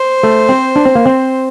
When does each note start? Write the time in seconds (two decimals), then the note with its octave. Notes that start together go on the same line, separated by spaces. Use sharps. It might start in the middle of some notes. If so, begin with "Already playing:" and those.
Already playing: C5
0.23 A3
0.49 C4
0.76 D4
0.85 C4
0.95 A#3
1.06 C4